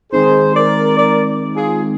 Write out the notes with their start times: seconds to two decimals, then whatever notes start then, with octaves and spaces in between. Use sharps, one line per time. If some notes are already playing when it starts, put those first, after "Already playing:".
0.13 D#3 G#3 C4 D#4 G#4 C5
0.55 A#4 D5
0.98 A#4 D5
1.55 F4 G#4